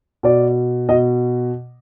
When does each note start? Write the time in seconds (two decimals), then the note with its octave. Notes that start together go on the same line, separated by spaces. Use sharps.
0.23 B2 D5
0.89 B2 D#5